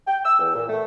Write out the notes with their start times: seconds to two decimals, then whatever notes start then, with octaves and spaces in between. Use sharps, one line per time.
0.07 G5
0.24 E6
0.39 E2
0.55 A#2
0.69 A3